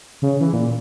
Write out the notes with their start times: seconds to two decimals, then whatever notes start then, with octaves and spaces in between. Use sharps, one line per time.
0.22 C#3
0.41 E3
0.53 A#2